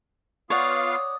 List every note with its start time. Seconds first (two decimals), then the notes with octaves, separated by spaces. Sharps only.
0.50 B3 F4 C#5 D5 F5 F#5 D#6